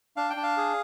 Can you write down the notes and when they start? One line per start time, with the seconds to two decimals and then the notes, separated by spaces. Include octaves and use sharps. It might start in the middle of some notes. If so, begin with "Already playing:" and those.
0.16 D4 F5
0.30 G5
0.36 D4
0.43 F5
0.57 G#4